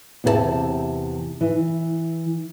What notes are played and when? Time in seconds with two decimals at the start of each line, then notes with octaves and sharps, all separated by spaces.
0.24 E2 C3 G4 B4 E5 A5
1.41 E3